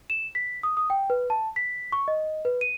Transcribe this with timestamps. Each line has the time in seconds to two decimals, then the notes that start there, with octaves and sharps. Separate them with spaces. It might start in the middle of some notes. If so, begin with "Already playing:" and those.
0.10 E7
0.35 B6
0.63 D#6
0.77 D#6
0.90 G5
1.10 B4
1.30 A5
1.56 B6
1.92 C#6
2.08 D#5
2.45 B4
2.61 D#7